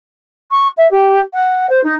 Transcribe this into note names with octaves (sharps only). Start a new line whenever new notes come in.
C#6
E5
G4
F#5
C5
D#4